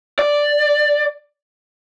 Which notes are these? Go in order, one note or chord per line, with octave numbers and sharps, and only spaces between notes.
D5